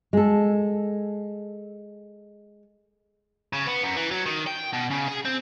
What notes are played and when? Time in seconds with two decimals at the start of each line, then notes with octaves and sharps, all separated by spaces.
0.13 G#3 A4
3.53 C#3
3.67 B3
3.83 F#2
3.96 E3
4.11 F#3
4.26 D#3
4.47 G5
4.73 B2
4.90 C#3
5.08 G#4
5.25 C4